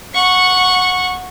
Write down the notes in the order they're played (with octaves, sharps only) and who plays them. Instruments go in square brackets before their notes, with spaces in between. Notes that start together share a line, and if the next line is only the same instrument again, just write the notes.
[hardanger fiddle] F#5 C#6